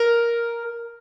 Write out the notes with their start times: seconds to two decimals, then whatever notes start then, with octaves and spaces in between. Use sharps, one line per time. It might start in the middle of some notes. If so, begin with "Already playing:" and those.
Already playing: A#4